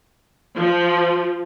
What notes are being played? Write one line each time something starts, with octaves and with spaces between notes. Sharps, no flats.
F3